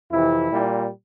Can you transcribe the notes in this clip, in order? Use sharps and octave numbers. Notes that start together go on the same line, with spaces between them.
F2 C3 E3 E4
A#2 G3